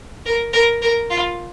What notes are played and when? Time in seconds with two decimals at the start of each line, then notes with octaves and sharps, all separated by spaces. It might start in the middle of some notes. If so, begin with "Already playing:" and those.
0.26 A#4
0.53 A#4
0.82 A#4
1.10 F4